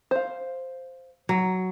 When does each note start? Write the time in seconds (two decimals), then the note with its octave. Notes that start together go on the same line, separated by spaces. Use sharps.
0.11 C5 F5
1.29 F#3